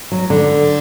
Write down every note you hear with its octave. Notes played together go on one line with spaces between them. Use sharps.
F#3
D3